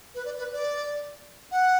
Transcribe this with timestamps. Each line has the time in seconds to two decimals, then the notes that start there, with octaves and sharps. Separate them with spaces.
0.15 B4
0.25 D5
0.39 B4
0.53 D5
1.51 F#5